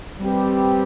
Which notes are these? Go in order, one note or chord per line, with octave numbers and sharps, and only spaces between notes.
G3 C4 G4 B4